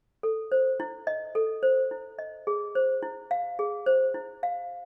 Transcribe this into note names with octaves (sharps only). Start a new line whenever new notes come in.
A4
C5
E4
D#5
A4
C5
E4
D#5
G#4
C5
E4
F5
G#4
C5
E4
F5